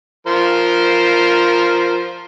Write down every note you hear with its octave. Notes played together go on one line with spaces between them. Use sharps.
F3 A#4 C5